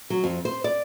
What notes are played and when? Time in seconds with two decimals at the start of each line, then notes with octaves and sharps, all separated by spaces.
0.10 F#3
0.24 F2
0.45 C5
0.64 D5